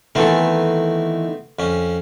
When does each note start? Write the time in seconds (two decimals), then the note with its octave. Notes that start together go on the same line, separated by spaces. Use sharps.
0.15 D#3 E3 A3 B3 C4 A4
1.59 F2 C#4